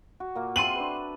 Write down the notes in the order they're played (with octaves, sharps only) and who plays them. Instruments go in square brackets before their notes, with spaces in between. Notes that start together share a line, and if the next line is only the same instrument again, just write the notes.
[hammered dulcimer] F#4
A#2 A#3
[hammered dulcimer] C4 E5 A5 [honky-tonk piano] C6 D#7 F#7
[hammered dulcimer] D4 B4